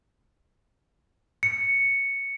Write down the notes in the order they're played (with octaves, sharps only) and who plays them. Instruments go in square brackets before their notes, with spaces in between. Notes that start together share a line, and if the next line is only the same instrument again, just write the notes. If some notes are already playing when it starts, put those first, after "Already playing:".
[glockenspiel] C#7